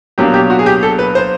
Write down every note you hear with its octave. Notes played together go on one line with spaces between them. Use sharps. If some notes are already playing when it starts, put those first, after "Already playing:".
B2 F#3 A#3 D4 G4
G4
F#4
G#4
G4
A4
B4
C5